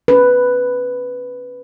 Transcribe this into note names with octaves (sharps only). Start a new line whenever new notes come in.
C#4 B4